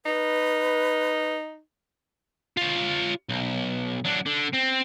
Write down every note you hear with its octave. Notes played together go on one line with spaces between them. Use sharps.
D#4 B4
F4 C#5
B1
F#3 D4
D3
C4